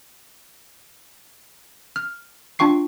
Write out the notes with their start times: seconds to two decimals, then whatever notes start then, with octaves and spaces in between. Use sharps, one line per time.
1.96 F6
2.59 D4 F4 G5 C#6 C7